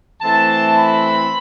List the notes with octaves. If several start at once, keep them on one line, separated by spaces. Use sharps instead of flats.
E3 A3 C4 A5
B5